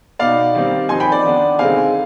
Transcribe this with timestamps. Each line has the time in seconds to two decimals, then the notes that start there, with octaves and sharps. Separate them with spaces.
0.19 B2 B3 D#4 D5 F5
0.55 D#3 G3 C4
0.89 F3 C4 D#4 G#5 C6
1.00 G5 B5
1.12 D5
1.23 D#3 B3 D4
1.59 D3 G#3 C4 D#4 F5 G#5